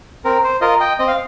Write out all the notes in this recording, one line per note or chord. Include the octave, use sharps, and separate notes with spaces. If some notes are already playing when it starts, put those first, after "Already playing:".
C4 A#4
C5
F4 A#4 D#5
D#5 G5
C4 D#5
F5